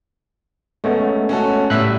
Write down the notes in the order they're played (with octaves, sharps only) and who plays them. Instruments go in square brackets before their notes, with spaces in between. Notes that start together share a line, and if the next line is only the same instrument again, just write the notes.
[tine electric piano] G#3 A3 B3 [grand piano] C#4
[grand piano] C#4 F#4 A4
[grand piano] A2 G3 [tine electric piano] E5 F#6